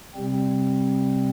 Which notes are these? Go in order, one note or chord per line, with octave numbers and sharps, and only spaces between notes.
C3 G3 C4